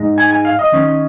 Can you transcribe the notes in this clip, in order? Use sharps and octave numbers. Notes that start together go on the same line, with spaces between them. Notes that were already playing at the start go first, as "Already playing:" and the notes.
Already playing: G#2 G#3 D#4
G#5
G#5
F5
D#5
D#3 C#4